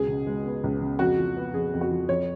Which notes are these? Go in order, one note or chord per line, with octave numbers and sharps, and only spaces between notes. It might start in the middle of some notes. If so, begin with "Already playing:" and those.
Already playing: C#2 B2 G#4
C#3
G#3
B3
C#2
C#3
F2 F#4
F3
B3
F2 G#4
F2
F#4
F3
F2 C#5